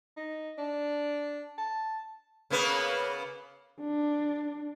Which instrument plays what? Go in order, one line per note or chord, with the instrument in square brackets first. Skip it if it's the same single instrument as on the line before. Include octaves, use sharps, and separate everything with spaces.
[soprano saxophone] D#4
D4
A5
[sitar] C#3 A#3 B3
[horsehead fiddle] D4